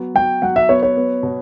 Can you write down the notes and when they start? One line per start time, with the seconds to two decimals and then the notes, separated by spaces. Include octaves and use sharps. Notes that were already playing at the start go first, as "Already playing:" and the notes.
Already playing: F#3 B3
0.15 F#3 G5
0.42 F#3 F#5
0.56 E5
0.69 B3 C#5
0.83 C#5
0.97 B3
1.23 B2